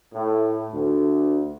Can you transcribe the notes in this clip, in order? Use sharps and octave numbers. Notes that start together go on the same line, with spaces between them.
A2
D2